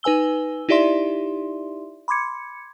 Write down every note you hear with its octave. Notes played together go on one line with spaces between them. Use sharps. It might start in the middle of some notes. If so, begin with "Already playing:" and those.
D#4 B4 G#5 E6 G7
D#4 E4 G4 D5 E5 C6
B5 C6 D6 G#6 C#7